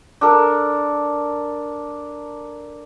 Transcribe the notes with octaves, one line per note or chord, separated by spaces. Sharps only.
D4 A4 A#4